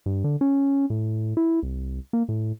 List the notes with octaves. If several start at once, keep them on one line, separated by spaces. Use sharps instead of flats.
G2
D3
C#4
A2
E4
C2
A#3
A2